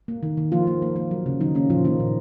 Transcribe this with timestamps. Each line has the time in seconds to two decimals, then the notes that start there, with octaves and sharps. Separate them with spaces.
0.08 A#3
0.23 D#3
0.37 D#3
0.52 F3 A#3 F4
0.67 A#3
0.82 A#3
0.96 A#3
1.11 F#3
1.26 C#3
1.41 D#3 F#3 D#4
1.55 C#3 A#3 C#4
1.70 A#2 F3 F4
1.85 D#3 A#3 D#4
2.00 A#2